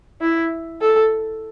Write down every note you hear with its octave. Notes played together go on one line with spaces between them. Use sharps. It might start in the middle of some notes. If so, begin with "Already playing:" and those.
E4
A4